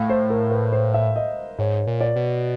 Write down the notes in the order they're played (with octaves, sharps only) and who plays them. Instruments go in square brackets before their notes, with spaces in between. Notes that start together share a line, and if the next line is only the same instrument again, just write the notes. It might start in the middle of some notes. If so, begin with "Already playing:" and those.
Already playing: [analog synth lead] A2 [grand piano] F5
[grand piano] C5
A#4
B4
C5
E5
D#5
[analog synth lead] G#2 [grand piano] C#5
[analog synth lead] A#2
[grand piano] D5
[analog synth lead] B2